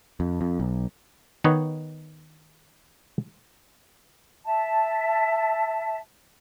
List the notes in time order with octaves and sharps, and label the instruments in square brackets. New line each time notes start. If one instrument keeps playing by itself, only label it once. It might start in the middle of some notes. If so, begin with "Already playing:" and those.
[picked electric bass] F2
F2
B1
[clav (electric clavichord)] D#3 B3 D#4 B4 C#5 D#5
[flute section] E5 A5